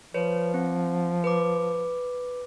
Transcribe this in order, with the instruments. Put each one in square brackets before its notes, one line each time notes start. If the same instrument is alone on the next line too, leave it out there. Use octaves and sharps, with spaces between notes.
[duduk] F3 [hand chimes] B4 C#5
[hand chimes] C4
B4 D6